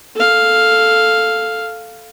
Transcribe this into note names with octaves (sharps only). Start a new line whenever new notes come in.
A4 F5